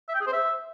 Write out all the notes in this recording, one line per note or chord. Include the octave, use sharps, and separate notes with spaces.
E5
G5
G#4
C5
E5